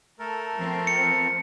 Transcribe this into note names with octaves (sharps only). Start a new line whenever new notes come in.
A3 A4 A#4
F3 C4
C#7